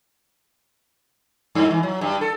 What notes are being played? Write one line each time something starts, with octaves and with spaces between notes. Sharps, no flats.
G2
E3
F#3
G2
A4